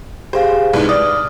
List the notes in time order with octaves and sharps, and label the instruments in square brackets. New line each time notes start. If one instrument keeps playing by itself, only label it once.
[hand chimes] G4 G#4 F5 [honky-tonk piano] C5
[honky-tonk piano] C2 G#2 [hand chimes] B4
[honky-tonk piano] D5 [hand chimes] D#6 F6